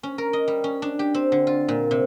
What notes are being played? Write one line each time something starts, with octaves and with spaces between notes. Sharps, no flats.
C#4
A#4
D#5
G3
C#4
D4
G4
C4
D3
F4
A#2
C3